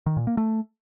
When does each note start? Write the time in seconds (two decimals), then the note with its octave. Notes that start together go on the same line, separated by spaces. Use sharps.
0.06 D#3
0.17 A#2
0.27 A#3
0.37 A3